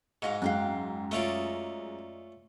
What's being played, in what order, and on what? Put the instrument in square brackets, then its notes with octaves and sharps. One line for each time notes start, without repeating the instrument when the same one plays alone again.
[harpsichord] G#2 [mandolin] F#4 D#5 F5
[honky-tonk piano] F#2 G#3 [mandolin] F5 G5 F#6
[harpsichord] A3 C#4 F4 [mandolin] D5 D#5